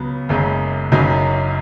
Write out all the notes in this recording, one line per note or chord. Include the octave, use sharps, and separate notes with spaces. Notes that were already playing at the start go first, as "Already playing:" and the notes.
Already playing: C#2 C#3 F#3 B3
F#1 F#2 C#3 G#3
F#1 F#2 C#3 F#3 D#4